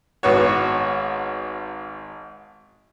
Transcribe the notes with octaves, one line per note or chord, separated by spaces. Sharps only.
G#1 B3 F#4 C#5